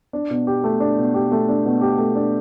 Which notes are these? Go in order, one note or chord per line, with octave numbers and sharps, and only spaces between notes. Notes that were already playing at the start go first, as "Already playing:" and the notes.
D4
B2
G4
A3
D4
B2
G4
A3
D4
B2
G4
A3
D4